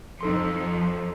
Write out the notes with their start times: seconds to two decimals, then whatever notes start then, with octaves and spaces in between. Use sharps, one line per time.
0.21 F2 F3 D#4 A4 C6